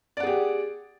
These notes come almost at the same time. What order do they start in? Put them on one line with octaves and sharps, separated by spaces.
D5 F#5 G#4 G4